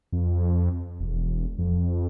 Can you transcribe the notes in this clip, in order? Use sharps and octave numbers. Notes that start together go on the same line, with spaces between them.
F2
E1
F2